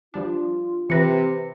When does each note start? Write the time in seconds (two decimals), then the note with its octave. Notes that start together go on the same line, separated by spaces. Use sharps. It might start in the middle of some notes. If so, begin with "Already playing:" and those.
0.14 F3 G3 D4 F4
0.90 C3 E3 B4 A#6 C#7